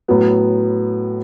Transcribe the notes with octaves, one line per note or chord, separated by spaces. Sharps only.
A2 F#3 B3